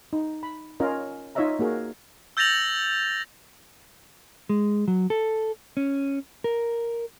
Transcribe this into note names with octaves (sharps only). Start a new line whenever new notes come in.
D#4
B5
C#4 F4 A#4 D#5
D#4 F4 C#5 D#5 E5 A#5
A#3 F#4 G#4 A#4
E6 G6 A6 A#6 F7 F#7
G#3
F#3
A4
C#4
A#4